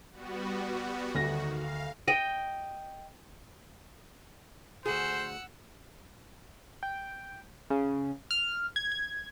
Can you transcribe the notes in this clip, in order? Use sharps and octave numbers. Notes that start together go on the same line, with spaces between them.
G3 B3 F#4
D2 D#3 F#4 A#6
F5
D#5 G5
D2 G#4 C5 F#5 E6
G5
C#3
F6
G#6
G#6